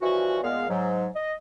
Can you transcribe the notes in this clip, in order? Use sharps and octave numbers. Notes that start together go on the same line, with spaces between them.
E3 F3 G3 C#4 F#4
A#2 G#3 B3 F5
G#2 F#3
D#5